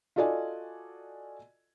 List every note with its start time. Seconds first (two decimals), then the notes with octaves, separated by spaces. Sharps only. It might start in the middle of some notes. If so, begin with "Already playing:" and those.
0.16 F4 F#4 A4 D5 D#5 G#5